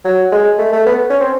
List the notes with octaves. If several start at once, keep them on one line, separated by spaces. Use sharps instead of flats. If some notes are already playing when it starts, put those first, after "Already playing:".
F#3
G#3
A3
A3
B3
C#4
C4